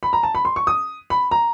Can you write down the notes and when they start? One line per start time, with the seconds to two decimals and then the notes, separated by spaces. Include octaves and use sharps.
0.03 B5
0.13 A#5
0.23 A5
0.35 B5
0.45 C6
0.56 C#6
0.67 D#6
1.10 B5
1.31 A#5